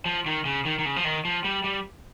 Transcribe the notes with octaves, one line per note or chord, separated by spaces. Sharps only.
F3
D#3
C#3
D#3
D#3
C#3
F3
D#3
F3
G3
G3